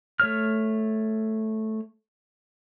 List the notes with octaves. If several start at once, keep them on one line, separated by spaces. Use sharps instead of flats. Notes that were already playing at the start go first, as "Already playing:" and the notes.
A3 C#5 F6